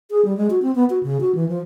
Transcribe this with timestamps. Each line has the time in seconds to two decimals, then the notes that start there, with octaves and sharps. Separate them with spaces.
0.10 G#4
0.25 G3
0.37 G#3
0.50 F#4
0.62 C4
0.75 B3
0.90 F#4
1.03 C#3
1.21 F#4
1.35 E3
1.49 F3